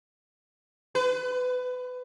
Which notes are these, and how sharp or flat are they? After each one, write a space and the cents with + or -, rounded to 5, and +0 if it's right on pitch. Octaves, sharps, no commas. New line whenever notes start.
B4 +25